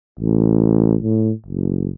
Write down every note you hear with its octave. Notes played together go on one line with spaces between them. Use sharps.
A1
A2
F#1